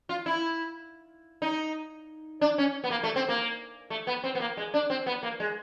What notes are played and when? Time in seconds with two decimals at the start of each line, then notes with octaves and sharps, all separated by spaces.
0.09 F4
0.26 E4
1.42 D#4
2.41 D4
2.58 C#4
2.84 B3
2.90 A#3
3.03 A3
3.16 C4
3.29 A#3
3.90 A3
4.07 B3
4.24 C4
4.35 B3
4.40 A#3
4.57 G#3
4.74 D4
4.90 C4
5.06 B3
5.23 A#3
5.40 G#3